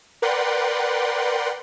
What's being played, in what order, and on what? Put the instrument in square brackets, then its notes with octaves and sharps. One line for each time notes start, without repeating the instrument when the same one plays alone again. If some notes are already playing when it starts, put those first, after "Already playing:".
[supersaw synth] A#4 B4 D5 F#5 G5 C6